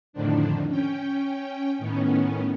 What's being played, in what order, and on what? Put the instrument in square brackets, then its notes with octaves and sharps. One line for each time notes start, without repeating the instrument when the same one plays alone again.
[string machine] F2 A2 D3 D#3 F3 D4
C#4 G5
A2 D#3 B3 C#4